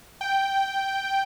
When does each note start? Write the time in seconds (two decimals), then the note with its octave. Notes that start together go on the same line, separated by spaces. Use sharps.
0.21 G5